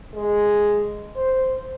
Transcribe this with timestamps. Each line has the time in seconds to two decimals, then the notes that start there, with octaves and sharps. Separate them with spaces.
0.14 G#3
1.16 C5